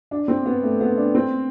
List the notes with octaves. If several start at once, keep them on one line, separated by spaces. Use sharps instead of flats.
D4
C4
B3
A3
B3
D4
C4